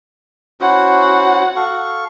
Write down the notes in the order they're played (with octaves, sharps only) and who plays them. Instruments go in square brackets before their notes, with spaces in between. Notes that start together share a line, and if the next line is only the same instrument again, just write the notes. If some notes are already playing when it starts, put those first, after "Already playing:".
[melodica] C#4 E4 C5 [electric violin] F#4 F#5
[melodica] A4 F5 C#6